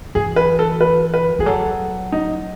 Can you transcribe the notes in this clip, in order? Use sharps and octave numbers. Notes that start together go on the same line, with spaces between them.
E3 G#4
B4
A4
B4
B4
E3 G#4
F#3 A4
D#4